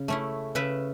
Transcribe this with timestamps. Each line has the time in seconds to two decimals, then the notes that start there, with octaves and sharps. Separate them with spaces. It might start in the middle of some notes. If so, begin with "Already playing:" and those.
Already playing: C#3
0.08 A3 C#4 E4
0.55 C#3 B4 E5